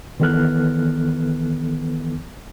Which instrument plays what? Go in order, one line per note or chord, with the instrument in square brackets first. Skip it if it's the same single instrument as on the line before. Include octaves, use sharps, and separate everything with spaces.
[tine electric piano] D#3 E3 B3 A4 F6 F#6